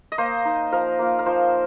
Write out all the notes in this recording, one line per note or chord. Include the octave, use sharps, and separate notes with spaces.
D#5
A#3 C5
D#4
F3 A#4
A#3 F4
A#4
F3 C5